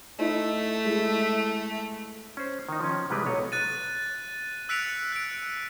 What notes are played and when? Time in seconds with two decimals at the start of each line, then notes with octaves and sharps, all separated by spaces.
0.19 A3 D#4 E4
0.85 G#3 E4
2.37 C#4 C5
2.69 D#3 D#4
2.80 F3 C#4
3.10 C3 E3 G3 G#3 G4 B4
3.26 B1 F#3 B3 C#5 D#5
3.52 F#6 A6 D#7
4.69 E6 F#6 B6 C#7 D7 F7
5.12 F#6 D7